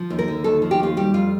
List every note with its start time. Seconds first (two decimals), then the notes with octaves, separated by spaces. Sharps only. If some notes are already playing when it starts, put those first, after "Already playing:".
Already playing: F3
0.10 D#2
0.19 A#4
0.28 D3
0.44 D#2 A4
0.62 F3
0.71 G4
0.80 D#2 F4
0.97 G3 G4
1.14 F2 F4